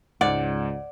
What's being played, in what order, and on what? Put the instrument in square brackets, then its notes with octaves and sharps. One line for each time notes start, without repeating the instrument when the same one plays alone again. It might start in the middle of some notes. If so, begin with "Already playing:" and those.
[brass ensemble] C#2 [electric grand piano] G#2 [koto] D5 [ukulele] F#5